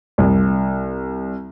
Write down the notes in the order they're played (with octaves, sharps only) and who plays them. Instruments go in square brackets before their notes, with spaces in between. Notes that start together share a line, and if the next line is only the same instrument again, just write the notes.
[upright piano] C2